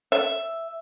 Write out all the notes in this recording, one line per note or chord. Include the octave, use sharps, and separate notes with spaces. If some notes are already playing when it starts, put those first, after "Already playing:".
E5